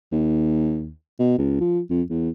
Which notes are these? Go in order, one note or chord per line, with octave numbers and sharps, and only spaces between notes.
D#2
B2
C#2
F3
F2
E2